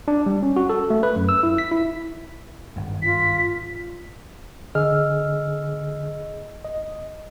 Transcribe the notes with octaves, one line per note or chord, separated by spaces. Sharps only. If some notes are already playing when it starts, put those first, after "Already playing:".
D4
G3
C#4
F#4
A4
A3
B4
F#2
E6
E4
B6
E4
G#1 G2
F4 B6
D3 G#4 D#5 E6 F6
D#5